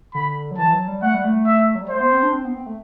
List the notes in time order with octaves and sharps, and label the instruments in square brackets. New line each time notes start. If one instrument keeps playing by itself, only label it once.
[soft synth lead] D3 [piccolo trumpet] B5
[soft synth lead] F#3
[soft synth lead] E3 [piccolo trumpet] A5
[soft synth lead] F#3
G3
[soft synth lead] A3 [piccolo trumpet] F#5
[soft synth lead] G3
A3
[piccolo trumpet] E5
[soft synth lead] F#3
G3
[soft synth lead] A3 [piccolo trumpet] C5
[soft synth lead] B3
C4
D4
C4
B3
C4
A3